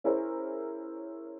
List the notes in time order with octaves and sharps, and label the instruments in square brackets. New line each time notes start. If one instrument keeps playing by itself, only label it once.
[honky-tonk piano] C#4 E4 G#4 A#4 C5 C#5